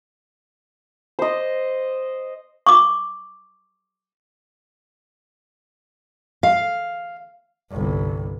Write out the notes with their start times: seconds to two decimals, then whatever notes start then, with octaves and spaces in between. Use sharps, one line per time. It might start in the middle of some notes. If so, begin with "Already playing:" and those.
1.19 C5 D#5
2.67 C#6 D6
6.43 F5
7.71 G1 C2